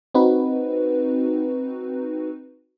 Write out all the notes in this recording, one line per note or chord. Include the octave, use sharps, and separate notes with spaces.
C4 D#4 F#4 B4